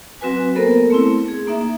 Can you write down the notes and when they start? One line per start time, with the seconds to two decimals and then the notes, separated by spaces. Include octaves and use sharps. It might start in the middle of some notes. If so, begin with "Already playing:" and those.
0.21 F#3 C4 F#4 B4 G#5
0.55 A#3 B3 A4 A#4 C5
0.90 A3 C4 E4
1.28 G#4
1.47 A#3 D#4 E5